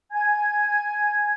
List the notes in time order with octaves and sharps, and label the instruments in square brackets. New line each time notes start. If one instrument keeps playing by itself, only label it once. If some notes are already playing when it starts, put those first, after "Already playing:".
[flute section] G#5 G#6